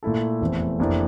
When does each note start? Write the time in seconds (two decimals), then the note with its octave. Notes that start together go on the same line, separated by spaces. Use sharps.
0.03 A#2 A3 E4 A4
0.41 F1 E2 E3 A3 C4
0.79 F1 F2 E3 A#3 D4